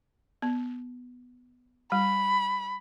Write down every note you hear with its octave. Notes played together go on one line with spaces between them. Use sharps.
B3
G3 B5